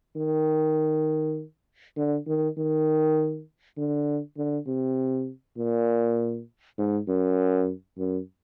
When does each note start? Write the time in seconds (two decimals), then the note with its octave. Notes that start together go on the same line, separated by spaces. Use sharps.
0.17 D#3
1.97 D3
2.27 D#3
2.58 D#3
3.78 D3
4.37 D3
4.67 C3
5.57 A#2
6.78 G#2
7.08 F#2
7.98 F#2